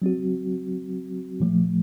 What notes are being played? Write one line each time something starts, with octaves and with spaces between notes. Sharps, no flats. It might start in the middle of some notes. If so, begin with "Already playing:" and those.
F#3 C4 F#4
A#2 F3 A3